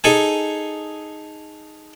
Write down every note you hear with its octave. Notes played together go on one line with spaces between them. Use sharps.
D#4 G#4 A4 G#5